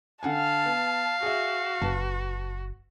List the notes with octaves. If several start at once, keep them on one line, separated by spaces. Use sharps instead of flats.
D3 F5 F#5 G#5 A5
B3
F#4 G#4 E5
F#1 B4 A5